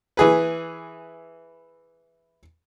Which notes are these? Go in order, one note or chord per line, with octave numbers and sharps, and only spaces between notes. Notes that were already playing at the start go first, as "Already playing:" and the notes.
E3 G#4 B4